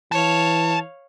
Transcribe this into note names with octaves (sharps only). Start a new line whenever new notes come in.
E3 C#5 F5 A5